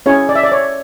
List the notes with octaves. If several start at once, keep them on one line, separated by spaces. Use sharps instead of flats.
C#4 E4 G#4 C#5
D5
E5
D5
C#5